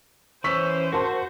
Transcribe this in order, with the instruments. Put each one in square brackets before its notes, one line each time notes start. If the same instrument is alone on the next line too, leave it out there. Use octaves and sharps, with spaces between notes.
[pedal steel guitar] E3 C#4 [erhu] C5 [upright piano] C#6 E6 B6
[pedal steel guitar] F#4 [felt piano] A#4 A5 C6